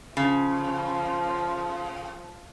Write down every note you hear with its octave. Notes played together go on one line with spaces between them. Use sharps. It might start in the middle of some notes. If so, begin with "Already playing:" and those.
C#3 F3